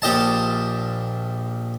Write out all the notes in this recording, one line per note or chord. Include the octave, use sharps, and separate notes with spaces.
A#1 G4 D#5 A5